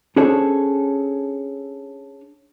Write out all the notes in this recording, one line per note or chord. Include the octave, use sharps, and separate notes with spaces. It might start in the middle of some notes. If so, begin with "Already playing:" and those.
C#4 D4 G#4 A4 C5 C#5